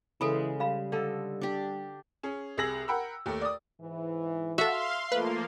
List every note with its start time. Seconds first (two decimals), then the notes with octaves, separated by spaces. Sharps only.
0.21 C#3 E3 G#3 A4 B5
0.60 G3 F5 B5
0.92 D3 A4 D#5
1.41 D4 G4
2.23 C#4 G#4
2.57 C2 G#4 E6 A#6 F#7
2.88 A#4 F#5 G5 B5 E6
3.26 D#2 A3
3.41 D5 D#6
3.81 G#2 E3
4.58 F#4 A4 E5 F5 C6
5.12 F3 A3 A#3 B4